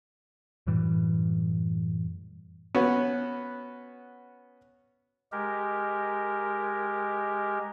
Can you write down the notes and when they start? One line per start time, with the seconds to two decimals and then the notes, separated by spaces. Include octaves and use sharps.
0.67 F#2 A2 E3 G3
2.75 B3 C#4 F#4
5.32 G#3 G4 A#4